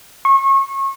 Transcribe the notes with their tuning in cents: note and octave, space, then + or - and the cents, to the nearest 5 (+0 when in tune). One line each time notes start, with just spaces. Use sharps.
C#6 -30